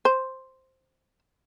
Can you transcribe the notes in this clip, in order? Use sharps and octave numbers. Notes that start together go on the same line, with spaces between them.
C5